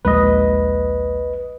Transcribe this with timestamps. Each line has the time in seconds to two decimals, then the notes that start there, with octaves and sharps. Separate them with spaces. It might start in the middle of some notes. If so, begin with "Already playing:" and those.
0.05 A#1 D#2 G#3 B4 D#5